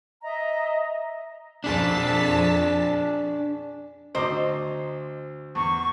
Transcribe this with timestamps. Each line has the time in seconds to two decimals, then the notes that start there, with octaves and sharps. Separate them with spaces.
0.23 D#5 E5 A#5
1.64 F2 D4 G#4 A5 B6
4.15 D2 C5 D#5 A#5 D6
5.55 E2 C#6